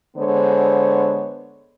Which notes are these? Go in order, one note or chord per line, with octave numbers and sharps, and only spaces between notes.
D3 G#3 B3 C5 C#5